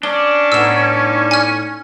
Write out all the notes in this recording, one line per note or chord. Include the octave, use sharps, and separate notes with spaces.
C#4 D4 G7
A2 B3 D#4 E6 E7
G#5 F6